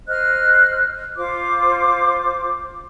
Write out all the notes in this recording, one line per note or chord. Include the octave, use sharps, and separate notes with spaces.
C5 D#5 F6 F#6
F4 C5 D6